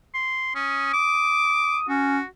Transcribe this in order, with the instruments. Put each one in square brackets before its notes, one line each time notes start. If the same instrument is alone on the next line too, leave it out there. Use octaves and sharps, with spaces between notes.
[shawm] C6
[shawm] C#4 [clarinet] D#6
[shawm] D6
[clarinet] C#4 [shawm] F#4